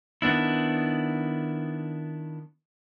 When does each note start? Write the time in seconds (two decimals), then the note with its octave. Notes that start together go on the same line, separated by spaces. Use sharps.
0.22 D#3 B3 D4 E4